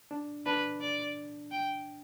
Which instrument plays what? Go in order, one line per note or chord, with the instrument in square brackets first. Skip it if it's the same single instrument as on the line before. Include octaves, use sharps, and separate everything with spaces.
[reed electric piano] D4
[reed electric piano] D4 [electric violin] B4
[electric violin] D5
G5